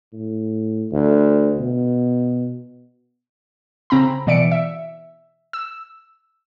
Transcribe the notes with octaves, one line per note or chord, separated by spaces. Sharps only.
A2
D2
B2
C#3 C4 A#5 B5
B2 E3 D5 E5 C#7 D7
E5
E6